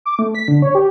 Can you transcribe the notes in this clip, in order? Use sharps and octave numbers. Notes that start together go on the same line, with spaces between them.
D6
A3
B6
D3
C#5
G4